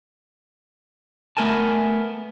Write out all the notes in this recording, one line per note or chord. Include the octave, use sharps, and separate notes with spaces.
A3 B3 A#4 G#5 A5